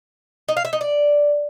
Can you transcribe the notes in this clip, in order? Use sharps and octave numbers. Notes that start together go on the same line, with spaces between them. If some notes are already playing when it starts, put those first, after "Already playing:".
D#4
F5
E5
D#4
D5